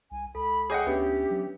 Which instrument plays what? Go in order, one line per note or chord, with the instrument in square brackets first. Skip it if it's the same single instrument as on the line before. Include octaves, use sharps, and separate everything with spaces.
[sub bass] C2 [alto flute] G#5
[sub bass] C#2 [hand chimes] A4 [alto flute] B5
[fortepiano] G#4 D#5 F#5 [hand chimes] C#5 D6 G6 [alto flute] G5
[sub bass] D2 [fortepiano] B3 [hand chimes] C#4 D4 E5 [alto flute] G4
[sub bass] F#3